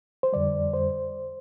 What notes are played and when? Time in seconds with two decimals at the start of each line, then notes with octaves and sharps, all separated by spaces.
0.23 C5
0.33 F2 D3 G3 D5
0.74 C5